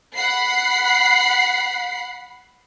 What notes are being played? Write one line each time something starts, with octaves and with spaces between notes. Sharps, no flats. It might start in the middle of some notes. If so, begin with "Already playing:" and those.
F#5 B5 C7